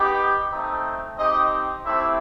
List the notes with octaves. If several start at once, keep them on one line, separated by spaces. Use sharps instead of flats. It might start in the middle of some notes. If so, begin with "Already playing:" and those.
Already playing: B3 D#4 G4
A3 C4 D#4
C4 D#4 G4 D#5
A3 C4 E4 G4 E5